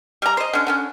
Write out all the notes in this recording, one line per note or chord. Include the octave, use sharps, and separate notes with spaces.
G3 A#5
C5 D#5
D3 C#4
D3 B3 C#4